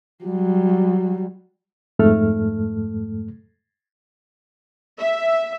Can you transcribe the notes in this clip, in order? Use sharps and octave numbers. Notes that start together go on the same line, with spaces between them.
F#3 G3
F2 G#2 A3 A4 F6
E5